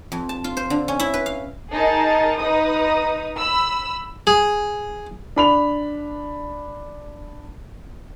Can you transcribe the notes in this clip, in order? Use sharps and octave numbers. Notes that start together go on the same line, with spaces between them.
F2
A5
F4
C5
D3
C#4
E4
B4
F5
D#4 G#4 A#4 A5
D#4 B4 D#6
B5 E6
G#4
D4 B5 F7